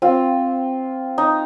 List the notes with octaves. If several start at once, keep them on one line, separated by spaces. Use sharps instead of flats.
C4 F4
D#4